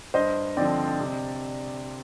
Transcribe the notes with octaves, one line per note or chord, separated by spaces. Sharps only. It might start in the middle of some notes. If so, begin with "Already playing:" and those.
G2 C5 D#5
D3 F3 C4 D5
C3